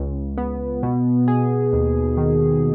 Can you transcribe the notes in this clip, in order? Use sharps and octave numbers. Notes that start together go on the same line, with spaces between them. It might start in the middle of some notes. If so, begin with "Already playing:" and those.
Already playing: C#2
B3
B2
G#4
D#2
D#3